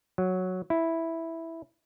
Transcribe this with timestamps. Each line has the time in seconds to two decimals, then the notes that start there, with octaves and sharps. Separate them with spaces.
0.18 F#3
0.70 E4